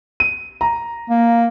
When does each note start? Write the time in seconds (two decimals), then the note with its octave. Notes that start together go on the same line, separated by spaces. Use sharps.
0.20 D#7
0.61 A#5
1.09 A#3